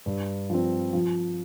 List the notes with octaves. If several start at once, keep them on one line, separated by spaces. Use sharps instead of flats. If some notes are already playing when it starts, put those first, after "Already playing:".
G2
F3 C4
F3